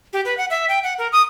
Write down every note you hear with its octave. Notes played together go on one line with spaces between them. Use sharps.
G4
B4
F#5
E5
G5
F#5
A#4
D#6